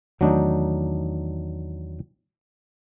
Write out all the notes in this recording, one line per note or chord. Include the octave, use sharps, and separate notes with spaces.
E2 D#3 F#3 A3 D4 D#4